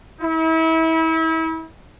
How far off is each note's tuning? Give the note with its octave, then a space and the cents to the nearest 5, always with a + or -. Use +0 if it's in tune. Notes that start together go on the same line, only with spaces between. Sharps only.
E4 -35